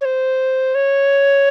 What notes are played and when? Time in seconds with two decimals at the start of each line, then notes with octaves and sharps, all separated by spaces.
0.01 C#5
0.05 C5
0.75 C#5